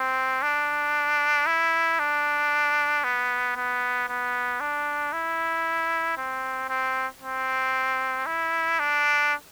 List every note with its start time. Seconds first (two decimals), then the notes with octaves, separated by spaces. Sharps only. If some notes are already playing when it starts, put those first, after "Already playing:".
Already playing: C4
0.42 D4
1.46 E4
1.99 D4
3.04 B3
3.56 B3
4.09 B3
4.60 D4
5.13 E4
6.18 C4
6.69 C4
7.21 C4
8.26 E4
8.79 D4